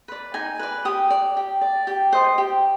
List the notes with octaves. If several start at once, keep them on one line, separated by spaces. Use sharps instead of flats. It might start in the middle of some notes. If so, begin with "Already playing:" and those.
B4 D5
D#4 G#5
B4 D5
G4 D#6
D5
G4
D5
G4
C5 D#5
G4